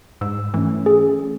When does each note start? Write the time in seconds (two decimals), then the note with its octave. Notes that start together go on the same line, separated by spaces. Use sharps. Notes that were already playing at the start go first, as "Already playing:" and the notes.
0.21 G#2 E6
0.54 E3 A3 C#4
0.86 G#4